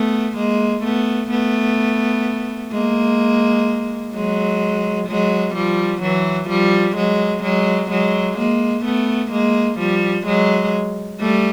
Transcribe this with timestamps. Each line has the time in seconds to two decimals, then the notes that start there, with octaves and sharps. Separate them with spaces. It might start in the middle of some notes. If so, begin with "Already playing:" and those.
Already playing: A3 B3
0.36 G#3 A#3
0.83 A3 B3
1.30 A3 B3
2.72 G#3 A#3
4.13 F#3 G#3
5.08 F#3 G#3
5.54 F3 G3
6.02 E3 F#3
6.49 F3 G3
6.96 F#3 G#3
7.43 F#3 G#3
7.90 F#3 G#3
8.38 G#3 A#3
8.84 A3 B3
9.31 G#3 A#3
9.79 F3 G3
10.26 F#3 G#3
11.21 G3 A3